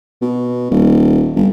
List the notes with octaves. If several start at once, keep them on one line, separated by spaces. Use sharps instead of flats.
B2
D#1
G1